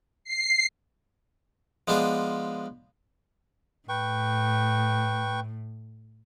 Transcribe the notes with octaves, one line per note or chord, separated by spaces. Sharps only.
C7
F3 G#3 B3 D4 F4 G#4
A2 B4 G5 C#6